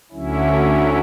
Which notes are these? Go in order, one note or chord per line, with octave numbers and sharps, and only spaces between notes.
D2 D3 F#3 C#4 E4